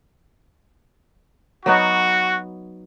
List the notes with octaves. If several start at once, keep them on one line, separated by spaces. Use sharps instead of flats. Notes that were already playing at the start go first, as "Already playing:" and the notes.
F#3 B3 D#4 F#4